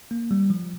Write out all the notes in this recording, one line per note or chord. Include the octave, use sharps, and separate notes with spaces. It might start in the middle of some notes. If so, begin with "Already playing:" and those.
A#3
G3
F3